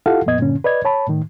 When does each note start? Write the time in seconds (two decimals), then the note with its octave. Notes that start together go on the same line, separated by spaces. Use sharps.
0.06 E4 F4 G4 A4 F5 F#5
0.26 F2 A#2 B3 D#5 G#6
0.39 G2 A#2 D3 C#4
0.64 B4 D5 D#5 G#6
0.85 C#5 A5 B5
1.08 A2 D#3